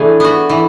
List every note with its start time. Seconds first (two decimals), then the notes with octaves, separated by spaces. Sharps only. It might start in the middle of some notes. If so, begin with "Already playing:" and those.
Already playing: E3 A3 D4 G#4
0.20 B3 F#4
0.50 E3